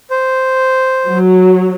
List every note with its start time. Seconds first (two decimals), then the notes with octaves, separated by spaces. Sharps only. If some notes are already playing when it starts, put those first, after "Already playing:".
0.10 C5
1.09 F#3